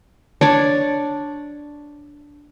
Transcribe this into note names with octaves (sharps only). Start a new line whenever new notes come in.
D4 C#5 D5